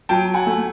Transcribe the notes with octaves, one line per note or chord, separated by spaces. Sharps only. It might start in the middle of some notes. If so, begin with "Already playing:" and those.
F#3 G5 A5
F#5 G#5
A3